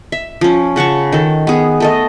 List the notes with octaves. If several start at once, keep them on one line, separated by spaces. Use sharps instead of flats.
E5
F3 C#4
C#3 F#5 A5 C#6
D#3 A4
B3 G#4
A3 A4 D#5